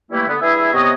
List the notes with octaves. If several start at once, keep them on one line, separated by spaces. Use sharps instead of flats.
E3 G3 A3 A#3 C#4 E4
D3 B3
G2 E4 G#4 E5
C3 B3 C#5 D#5